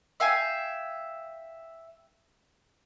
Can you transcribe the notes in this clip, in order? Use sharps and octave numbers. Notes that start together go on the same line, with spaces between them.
E5 F5 G5 G#5